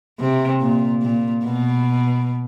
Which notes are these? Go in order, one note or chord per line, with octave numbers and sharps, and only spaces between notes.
C3
A#2
A#2
B2